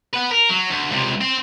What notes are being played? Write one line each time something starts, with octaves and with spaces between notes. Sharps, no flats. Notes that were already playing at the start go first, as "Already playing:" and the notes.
B4 F#5
A#4
F#3
D2
C#2 C3
C4